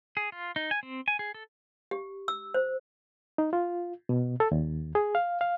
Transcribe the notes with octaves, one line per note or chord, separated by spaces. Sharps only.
G#4
F4
D#4
G#5
C4
G#5
G#4
A4
G4
E6
C5
D#4
F4
B2
A4
D#2
G#4
F5
F5